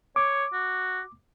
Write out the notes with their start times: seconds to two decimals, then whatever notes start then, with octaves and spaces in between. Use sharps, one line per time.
0.16 C#5 D6
0.53 F#4